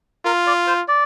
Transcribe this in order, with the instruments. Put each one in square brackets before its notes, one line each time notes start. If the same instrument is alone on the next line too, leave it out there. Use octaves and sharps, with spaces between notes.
[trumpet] F4 [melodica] A#4
[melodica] D5
C5
D5